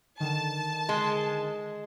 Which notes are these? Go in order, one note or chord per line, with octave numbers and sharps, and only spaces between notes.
D3 D#3 A5
G#3